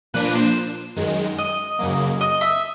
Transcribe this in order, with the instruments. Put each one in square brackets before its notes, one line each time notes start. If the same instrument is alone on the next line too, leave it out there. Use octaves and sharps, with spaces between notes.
[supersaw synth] A#2 F3 A#3 D4 [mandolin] B4
[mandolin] C5
[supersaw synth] F#2 D#3 G#3
[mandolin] D#5
[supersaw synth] F#2 C#3 F#3 A#3
[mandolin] D#5
E5